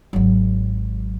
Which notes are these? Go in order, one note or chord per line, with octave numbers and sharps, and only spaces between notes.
G#1 F#3